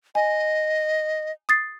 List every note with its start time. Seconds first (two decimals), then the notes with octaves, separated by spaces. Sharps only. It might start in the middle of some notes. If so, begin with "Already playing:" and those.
0.15 D#5 G#5
1.49 D#6 A6 C7